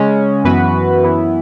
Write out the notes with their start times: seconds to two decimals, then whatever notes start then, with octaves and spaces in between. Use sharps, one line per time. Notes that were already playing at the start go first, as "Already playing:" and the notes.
Already playing: C#3 G#3 C#4
0.44 F#2 E3 B3 F#4 B4
1.03 F#2 E3 B3 E4